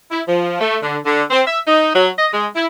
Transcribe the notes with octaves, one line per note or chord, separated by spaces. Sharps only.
E4
F3
A3
D3
D3
C4
E5
D#4
F#3
D#5
G#3
E4